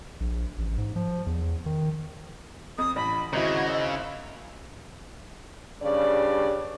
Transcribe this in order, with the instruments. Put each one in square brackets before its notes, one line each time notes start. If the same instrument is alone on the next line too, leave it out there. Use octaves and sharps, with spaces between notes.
[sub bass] A#1
A1
G#2
F3
E2
D#3
[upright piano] F2 [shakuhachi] D#6
[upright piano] A1 [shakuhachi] B5
[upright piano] G#1 E4 [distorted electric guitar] C#3 [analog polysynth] F#4 G#6 A#6 [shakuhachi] D#5
[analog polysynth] F5 E6
[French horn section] G2 C#3 D5